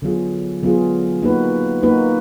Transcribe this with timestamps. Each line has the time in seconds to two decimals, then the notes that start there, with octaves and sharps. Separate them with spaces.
0.02 D3 F#3 B3 F4 G#4
0.63 D3 F#3 B3 F4 G#4
1.22 A#3 D#4 F#4 B4
1.83 A#3 D#4 F#4 B4